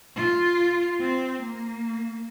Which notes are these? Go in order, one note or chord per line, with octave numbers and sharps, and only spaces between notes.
F4
C4
A#3